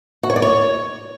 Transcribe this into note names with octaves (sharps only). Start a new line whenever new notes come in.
F#4
C#5
D5
C#5